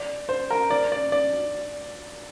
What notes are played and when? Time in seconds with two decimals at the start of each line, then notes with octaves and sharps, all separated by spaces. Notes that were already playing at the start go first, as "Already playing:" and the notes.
Already playing: D5
0.29 C5
0.51 A#4
0.70 D5
0.92 D5
1.12 D5